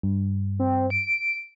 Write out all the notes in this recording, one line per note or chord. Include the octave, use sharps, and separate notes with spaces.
G2
C4
D7